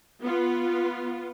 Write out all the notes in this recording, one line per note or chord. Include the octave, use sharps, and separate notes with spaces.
B3 F4